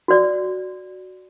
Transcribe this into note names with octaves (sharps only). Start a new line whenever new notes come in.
F#4 D5